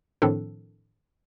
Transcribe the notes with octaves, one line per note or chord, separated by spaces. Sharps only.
A2 D#3 F3 C4 D4 A4